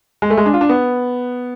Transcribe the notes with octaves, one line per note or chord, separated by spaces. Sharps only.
G#3
A3
G#3
D4
F4
D4
B3